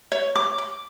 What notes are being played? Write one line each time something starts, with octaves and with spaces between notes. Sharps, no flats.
C#5
D6
D6